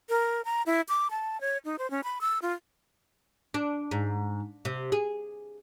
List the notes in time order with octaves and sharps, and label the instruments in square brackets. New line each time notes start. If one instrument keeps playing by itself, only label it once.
[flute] A#4
A#5
E4
D6
A5
C#5
D#4
C5
C#4
B5
E6
F4
[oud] D4
G#2
C3
G#4